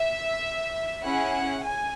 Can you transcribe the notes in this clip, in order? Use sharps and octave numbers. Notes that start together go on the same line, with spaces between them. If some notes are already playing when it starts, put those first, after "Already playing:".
Already playing: E5
C#4 E4 G#4 F#5
G#5